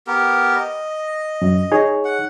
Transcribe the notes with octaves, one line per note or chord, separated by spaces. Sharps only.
B3 G4 A#4
D#5
F#2
D#4 G#4 C#5
F#5